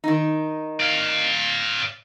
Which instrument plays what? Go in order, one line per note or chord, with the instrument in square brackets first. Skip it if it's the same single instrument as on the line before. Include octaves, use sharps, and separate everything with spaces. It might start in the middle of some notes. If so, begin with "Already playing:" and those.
[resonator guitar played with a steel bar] D#3 D#4
[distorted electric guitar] D5 F5